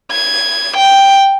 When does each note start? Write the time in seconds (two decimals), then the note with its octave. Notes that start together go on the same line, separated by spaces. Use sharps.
0.12 G#6
0.77 G5